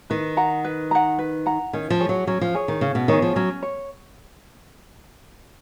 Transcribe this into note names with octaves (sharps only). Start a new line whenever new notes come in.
D#3 B4
F#5 A#5
B4
F#5 A#5
B4
F#5 A#5
D#3 C#4
F3
G#4 C#5
F#3
F#3 C#4
F3
G#4 C#5
D#3
C#3 C#4
B2
D#3 G#4 C#5
F3
F#3 C#4
C#5